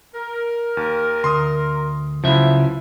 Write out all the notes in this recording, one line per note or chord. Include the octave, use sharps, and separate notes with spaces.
A#4
D#2
D2 C6 D#6
C#2 C#3 F3 F#3 E4 E5